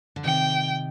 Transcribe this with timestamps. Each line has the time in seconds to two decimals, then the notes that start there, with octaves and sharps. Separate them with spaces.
0.16 D3
0.24 C3 D#3 G5